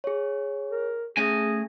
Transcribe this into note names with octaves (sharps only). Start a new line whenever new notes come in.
G#4 C#5
A#4
A3 C#4 G#4 G#5 A#6